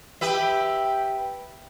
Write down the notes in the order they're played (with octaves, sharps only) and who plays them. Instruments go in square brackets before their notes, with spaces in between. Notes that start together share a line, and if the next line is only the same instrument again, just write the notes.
[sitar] G4 B4 E5